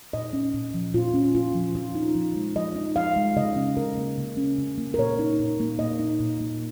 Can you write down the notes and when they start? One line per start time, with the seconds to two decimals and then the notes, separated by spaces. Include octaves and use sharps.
0.13 A#2 D#5
0.33 C#4
0.54 A#2
0.74 F3
0.94 A#2 F4
1.14 C#4
1.35 A#2 F4
1.55 F3
1.75 F3 F4
1.95 D#4
2.15 F3
2.35 G#3
2.56 F3 D#5
2.76 D#4
2.96 F3 F5
3.16 G#3
3.36 C#3 D#5
3.56 C#4
3.77 C#3 A#4
3.98 A#3
4.18 C#3
4.37 C#4
4.58 C#3
4.78 A#3
4.94 A#4
4.98 A#2 C#5
5.19 D#4
5.39 A#2
5.60 A#3
5.79 A#2 D#5
5.99 D#4
6.20 A#2
6.41 A#3